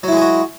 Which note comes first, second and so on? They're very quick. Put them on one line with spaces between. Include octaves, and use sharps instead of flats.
F#3 E4 G#3 G#4 F#4